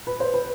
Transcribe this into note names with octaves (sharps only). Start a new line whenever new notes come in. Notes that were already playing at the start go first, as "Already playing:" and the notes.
B4
C5
B4